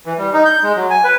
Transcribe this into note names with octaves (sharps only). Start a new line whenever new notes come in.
E3
G3
D#4
G6
G#3
F#3
G#5
B4